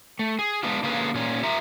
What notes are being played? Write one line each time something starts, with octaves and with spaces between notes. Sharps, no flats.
A3
G#4
G#3 B3 D4 F4
D3 A#3 C#4 F4 G#4 B4
A#2 C#4
F4 A#4 E5 A#5